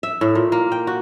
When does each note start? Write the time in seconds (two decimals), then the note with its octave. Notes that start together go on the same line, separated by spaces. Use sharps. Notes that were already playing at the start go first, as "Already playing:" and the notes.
0.03 E5
0.21 A2
0.35 A#2
0.52 A#3
0.72 G5
0.87 F#4